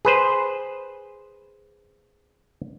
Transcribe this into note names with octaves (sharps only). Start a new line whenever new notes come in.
G#4 B4 C5